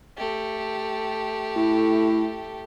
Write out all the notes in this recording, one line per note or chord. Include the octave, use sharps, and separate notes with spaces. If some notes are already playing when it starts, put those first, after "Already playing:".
A3 G4
A2